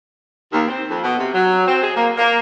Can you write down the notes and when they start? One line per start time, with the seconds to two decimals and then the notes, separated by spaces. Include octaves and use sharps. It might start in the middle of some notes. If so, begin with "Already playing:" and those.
0.52 D#2
0.68 C4
0.90 F2
1.03 B2
1.18 C3
1.34 F#3
1.67 C4
1.83 G#4
1.96 A#3
2.17 A#3